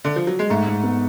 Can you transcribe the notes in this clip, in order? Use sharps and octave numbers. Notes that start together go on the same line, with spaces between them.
D3
F3
F#3
G#3
G#2 A3
G#2
B3